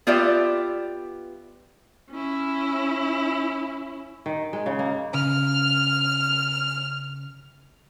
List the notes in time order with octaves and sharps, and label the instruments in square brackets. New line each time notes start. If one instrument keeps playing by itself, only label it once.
[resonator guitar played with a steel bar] B3 F4 G4 D5 E5
[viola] C#4 E4
[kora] D#3
G#3
C#3
A#3
[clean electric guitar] C#3 [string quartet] F6